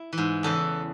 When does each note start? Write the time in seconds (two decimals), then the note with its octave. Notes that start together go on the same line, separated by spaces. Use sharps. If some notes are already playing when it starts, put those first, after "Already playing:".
Already playing: E4
0.13 E3
0.18 G#2
0.43 E2 C#3 E3 A4